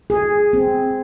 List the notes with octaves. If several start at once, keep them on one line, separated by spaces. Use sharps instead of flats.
G#4
C4